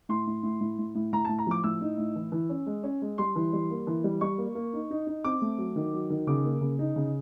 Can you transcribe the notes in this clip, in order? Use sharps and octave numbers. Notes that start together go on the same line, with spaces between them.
A2 C6
A2
A2
A2
A2
A2
A2 A#5
A5
A2
A#5
F3 D6
A2 E6
D#4
A2
E3
E3
C#4
G#3
C#4
G#3
G3 C6
E3
G3
A#3
E3
G3
G3 C#6
A#3
A#3
D#4
D#4
D#4
C4 D6
A3
F#3
D#3
F#3
D#3
C#3 D6
A#3
C#3
D#4
C#3